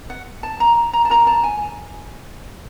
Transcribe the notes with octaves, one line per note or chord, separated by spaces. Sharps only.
F#5
A5
A#5
A#5
A5
F4 A#4 A#5
A5
G#5